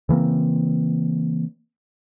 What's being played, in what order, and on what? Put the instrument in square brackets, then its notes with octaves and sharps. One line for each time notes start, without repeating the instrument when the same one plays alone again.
[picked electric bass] C#3 E3 A#3 C4